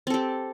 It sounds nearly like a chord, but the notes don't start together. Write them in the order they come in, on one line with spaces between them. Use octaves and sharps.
C4 A4 G4